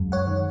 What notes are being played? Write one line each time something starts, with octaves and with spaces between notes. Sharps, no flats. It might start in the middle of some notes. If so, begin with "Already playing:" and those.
Already playing: F#2 G#3
C#5 F#5
D#3